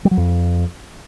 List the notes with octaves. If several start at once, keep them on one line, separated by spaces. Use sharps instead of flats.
G3
F#3
F2